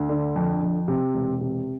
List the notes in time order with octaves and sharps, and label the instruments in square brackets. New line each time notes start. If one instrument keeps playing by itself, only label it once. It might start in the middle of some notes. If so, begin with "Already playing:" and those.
Already playing: [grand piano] D2
D3
F2
F2
C3
E1
C3